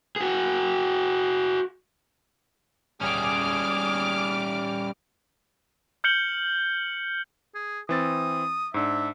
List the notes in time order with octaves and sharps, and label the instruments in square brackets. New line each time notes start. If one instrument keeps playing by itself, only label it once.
[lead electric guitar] F#4 G#4
[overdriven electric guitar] G3 C#4 [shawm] G#4 [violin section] D6 F6
[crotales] F6 G6 C#7 F#7 G7
[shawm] G#4
[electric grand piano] E3 C4 A6 [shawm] D#6
[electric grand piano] G#2 D4 [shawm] E5